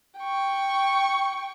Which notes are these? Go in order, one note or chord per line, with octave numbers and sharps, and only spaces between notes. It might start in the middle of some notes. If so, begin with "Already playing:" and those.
G5 C#6